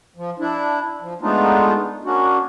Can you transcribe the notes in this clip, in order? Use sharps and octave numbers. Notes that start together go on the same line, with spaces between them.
F3
D4 E4
F3
G#3 A3 B3 D4 D#4 F4
A#3 C#4 D4 F#4